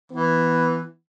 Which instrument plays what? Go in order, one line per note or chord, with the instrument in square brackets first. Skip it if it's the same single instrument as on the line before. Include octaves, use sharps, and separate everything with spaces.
[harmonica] E3 [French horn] B3